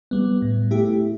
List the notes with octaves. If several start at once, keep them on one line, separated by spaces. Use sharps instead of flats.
G3 B3
A2
A3 E4 G4